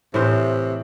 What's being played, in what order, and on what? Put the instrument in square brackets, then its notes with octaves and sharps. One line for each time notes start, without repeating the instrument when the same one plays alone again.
[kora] A2 E3 C5 [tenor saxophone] C3